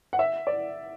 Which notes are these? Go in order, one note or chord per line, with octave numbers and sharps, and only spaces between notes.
F#5
E5
D5